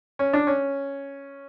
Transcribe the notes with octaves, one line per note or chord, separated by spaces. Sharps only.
C#4
D4
C#4